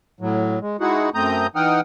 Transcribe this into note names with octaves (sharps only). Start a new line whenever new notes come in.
A2 F#3
G#3
G#3 D#4 E4 F#4 G#4 F#5
F#2 A3 C4 A#5 D#6 G6
E3 D#4 F#5 G5 D#6 F6